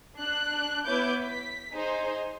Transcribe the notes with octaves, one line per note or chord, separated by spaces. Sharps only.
D4 F#6
B3 E4 B4 C#5 D6 G6
B6
D#4 G#4 C5